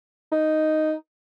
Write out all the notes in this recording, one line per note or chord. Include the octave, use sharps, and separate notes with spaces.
D#4